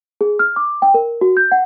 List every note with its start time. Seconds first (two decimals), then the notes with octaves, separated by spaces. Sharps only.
0.21 G#4
0.39 F6
0.56 D6
0.82 G5
0.94 A#4
1.21 F#4
1.37 G6
1.52 F#5